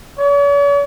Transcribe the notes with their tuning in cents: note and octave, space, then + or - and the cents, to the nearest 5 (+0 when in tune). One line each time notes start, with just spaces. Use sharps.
C#5 +45